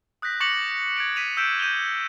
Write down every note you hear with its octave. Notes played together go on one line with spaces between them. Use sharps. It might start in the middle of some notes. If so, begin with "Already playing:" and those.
D#6 F#6 G6 A#6 B6
C#6 D6 A6 A#6 C#7 F#7
G#6 A#6 D7 F#7
B6 D#7 F7
E6 F#6 G6 B6 D7 E7
G6 D#7 F7 G7